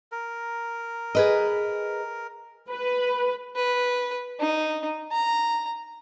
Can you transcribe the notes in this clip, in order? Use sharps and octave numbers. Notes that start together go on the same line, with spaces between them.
A#4
G#4 B4 D#5
B4
B4
D#4
A#5